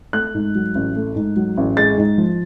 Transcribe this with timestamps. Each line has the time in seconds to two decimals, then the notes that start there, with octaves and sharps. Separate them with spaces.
0.13 A3 F#6
0.34 G#2
0.55 F#3
0.75 A1
0.96 A3
1.16 G#2
1.36 F#3
1.57 A1
1.77 G#3 A6
1.97 G#2
2.18 F3